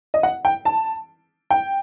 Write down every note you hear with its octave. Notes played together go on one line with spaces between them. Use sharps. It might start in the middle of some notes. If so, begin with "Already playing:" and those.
D#5
F#5
G5
A5
G5